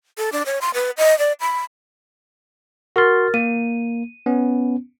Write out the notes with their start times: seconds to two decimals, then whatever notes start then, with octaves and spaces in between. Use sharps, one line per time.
0.18 A4
0.32 D4
0.46 C#5
0.61 C6
0.74 B4
0.98 D#5
1.19 D5
1.40 B5
2.96 F#4 A#4 C6 F6 A6
3.34 A#3 D#7
4.26 B3 C#4